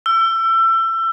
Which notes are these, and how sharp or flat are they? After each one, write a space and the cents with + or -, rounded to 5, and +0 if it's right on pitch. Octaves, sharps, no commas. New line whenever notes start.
E6 +30